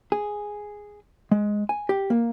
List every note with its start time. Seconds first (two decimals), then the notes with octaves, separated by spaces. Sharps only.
0.12 G#4
1.31 G#3
1.69 G#5
1.89 G4
2.10 A#3